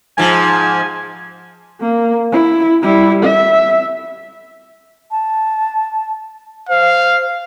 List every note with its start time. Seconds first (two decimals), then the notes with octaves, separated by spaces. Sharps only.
0.18 G#2 F3 G#5
1.81 A#3
2.32 E4
2.82 G3 E4
3.24 E5
5.11 A5
6.69 C5 F5